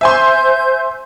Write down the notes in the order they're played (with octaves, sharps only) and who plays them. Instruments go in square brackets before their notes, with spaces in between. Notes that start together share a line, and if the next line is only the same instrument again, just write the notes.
[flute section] C5 G6 [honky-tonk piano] E5 G#5 C6